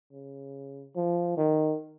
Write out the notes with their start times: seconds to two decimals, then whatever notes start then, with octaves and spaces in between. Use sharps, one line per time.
0.12 C#3
0.96 F3
1.37 D#3